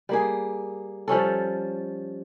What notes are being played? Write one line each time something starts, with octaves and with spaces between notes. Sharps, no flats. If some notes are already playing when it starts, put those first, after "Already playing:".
G3 A#3 G#4
F3 G3 C#4 A4